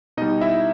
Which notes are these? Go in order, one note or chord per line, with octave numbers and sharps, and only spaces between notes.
B2 G3 D#4 D#5
E4 E5